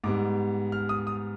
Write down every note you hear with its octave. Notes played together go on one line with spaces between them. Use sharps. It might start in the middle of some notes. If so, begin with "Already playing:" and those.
G#2 G3 B3 D6
F6
D#6
D#6